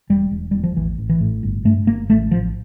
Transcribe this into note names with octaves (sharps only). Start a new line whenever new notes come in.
E1 G3
E1
E2 G3
F3
A1 E3
A1
E3
A2
G1
G2 A3
G1 A#3
A1 A3
A1 F3